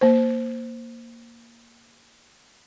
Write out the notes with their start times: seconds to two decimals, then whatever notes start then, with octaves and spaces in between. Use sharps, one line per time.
0.01 A#3 C5